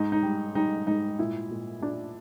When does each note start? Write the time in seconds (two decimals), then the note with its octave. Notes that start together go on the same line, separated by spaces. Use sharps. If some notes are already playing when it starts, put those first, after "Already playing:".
Already playing: G#2 D#4
0.12 D#4
0.23 G3
0.55 G3 D#4
0.87 G#2 D#4
1.19 A#2 E4
1.51 A#2
1.81 A#2 D4